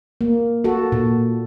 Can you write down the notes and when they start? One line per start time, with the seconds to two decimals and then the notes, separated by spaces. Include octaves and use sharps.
0.21 A#3
0.64 F#4 A4
0.92 A#2